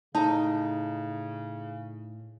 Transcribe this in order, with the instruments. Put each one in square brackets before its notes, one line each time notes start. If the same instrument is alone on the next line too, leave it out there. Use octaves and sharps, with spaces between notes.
[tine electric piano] A2 [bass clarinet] C#3 [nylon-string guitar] D#4 [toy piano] A5 A#5